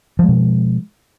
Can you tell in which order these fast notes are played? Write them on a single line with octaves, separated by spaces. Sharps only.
F3 G#3 B2